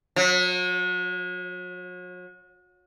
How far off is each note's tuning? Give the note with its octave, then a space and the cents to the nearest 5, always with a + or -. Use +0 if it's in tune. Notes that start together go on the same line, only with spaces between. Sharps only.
F#3 -40